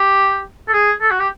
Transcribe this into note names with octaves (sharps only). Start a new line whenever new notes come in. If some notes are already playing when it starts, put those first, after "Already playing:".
Already playing: G4
A4
G#4
A4
F#4
G4